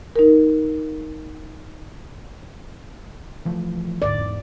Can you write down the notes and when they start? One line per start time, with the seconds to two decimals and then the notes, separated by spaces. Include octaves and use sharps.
0.16 D#4 A#4
3.45 E3 F3 A3
4.02 D2 G#2 D5
4.17 E2 G#2